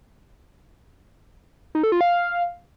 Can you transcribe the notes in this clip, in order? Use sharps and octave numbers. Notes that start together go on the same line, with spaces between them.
D#4
A4
F4
F5